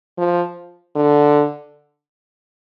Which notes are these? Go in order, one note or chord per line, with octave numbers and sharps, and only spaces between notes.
F3
D3